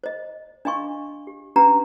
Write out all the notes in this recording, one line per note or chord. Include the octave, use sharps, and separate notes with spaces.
C5 D#5
D4 D#5 F5 G#5 C6 C#6
G4
C#4 D4 G4 B4 F#5 A#5